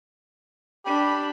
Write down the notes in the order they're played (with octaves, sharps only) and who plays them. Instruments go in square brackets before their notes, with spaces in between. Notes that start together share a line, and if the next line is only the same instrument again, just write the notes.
[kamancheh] D4 B5 [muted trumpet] G4